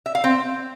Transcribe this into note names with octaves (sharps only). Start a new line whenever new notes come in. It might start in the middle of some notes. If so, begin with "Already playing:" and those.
E5
F5
C4